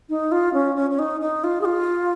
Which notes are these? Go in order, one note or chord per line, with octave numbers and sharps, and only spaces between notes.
D#4
F4
C#4
C#4
C#4
D#4
D#4
F4
G#4
F4